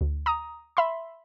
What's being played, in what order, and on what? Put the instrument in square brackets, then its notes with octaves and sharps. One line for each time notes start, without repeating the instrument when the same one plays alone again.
[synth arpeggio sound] D2
A#5 D#6
E5 B5 C6